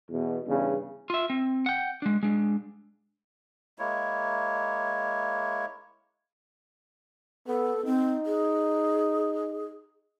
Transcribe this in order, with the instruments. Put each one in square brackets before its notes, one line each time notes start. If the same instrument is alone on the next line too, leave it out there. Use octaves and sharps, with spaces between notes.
[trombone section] E2 B2
E2 G2 C#3
[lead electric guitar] F4 E5
C4
F#5 G5
G#3 D4
G#3 D4
[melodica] G#3 A#3 E4 C#5
[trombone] B3 [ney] A4
[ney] C4 [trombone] D#4
[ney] G#4